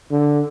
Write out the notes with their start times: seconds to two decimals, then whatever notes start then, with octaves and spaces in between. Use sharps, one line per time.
0.11 D3